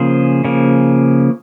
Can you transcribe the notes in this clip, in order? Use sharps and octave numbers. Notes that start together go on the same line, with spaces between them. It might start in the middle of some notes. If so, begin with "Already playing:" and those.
Already playing: C#3 F3 A#3 G#4 C5
C#3 F3 A#3